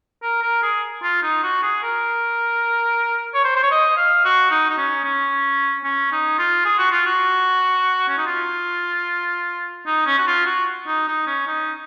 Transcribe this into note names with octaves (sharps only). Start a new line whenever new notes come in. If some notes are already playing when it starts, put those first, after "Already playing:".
A#4
A#4
G#4
F4
D#4
F#4
G#4
A#4
C#5
C5
C5
C#5
D#5
F5
F#4
D#4
D#4
C#4
C#4
C#4
D#4
F4
G#4
F#4
F4
F#4
C#4
D#4
F4
D#4
C#4
F#4
F4
F#4
D#4
D#4
C#4
D#4